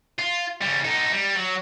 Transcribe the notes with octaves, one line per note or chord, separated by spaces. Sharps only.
F4
C#3 G3
D#4 A4
G3
F#3